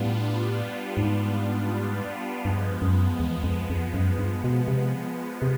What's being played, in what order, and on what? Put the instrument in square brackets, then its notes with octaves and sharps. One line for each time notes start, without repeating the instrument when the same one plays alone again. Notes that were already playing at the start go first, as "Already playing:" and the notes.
Already playing: [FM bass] A2 [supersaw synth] G3 B3 D4 F4
[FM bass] G#2
[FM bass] G2 [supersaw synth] F3 G#3 B3
[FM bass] F#2
E2
F2
F2
F#2
G2
B2
C3
C3